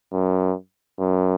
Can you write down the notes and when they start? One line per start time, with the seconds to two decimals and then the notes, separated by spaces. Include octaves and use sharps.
0.13 F#2
0.99 F#2